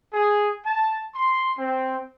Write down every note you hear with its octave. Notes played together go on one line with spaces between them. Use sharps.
G#4
A5
C6
C4